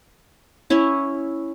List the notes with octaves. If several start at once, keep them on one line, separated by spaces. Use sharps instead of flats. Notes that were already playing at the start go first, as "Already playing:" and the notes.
C#4 E4